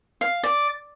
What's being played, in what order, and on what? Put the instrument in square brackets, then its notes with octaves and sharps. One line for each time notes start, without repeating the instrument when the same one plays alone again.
[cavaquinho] F5
D5